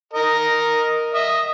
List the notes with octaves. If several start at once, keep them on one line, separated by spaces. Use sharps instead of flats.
A#4 D#5
D#5 E5